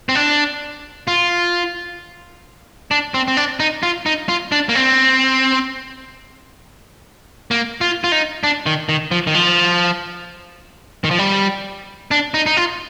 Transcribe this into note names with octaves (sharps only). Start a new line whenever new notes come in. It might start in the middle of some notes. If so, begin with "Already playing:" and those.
C4
D4
F4
D4
C4
C4
D4
D#4
F4
D#4
F4
D4
A#3
C4
A#3
F4
F4
D#4
D4
D#3
D#3
F3
D#3
F3
D#3
F3
G3
D4
D#4
D#4
F4